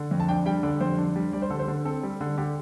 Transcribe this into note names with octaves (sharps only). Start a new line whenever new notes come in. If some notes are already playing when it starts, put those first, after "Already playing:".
Already playing: D3
F2
A5
D4 G5
G3 G5
D3 D5
F2 C5
D4
G3
G3 D5
C5
D3 A4
C5
D3
C4 A4
G3
D3
D3 G4